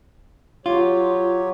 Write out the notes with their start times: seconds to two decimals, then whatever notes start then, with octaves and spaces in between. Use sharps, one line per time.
0.66 F#3 F4 G4 C#5